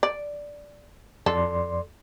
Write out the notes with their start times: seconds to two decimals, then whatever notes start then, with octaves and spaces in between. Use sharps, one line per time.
0.03 D5
1.26 F2 A4 D5 C6